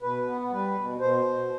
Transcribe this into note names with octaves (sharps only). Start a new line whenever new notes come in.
B2 B4
B3
G3 B4
B2
B2 C5
B2